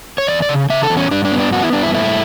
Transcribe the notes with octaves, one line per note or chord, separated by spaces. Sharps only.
C#5
E2 D5
D5
C#3
C#3 E5
A4
E2
C#4
G2 D4
D4
B3
D4
B3 F#4
E4
G2 D4
E4
A3 E4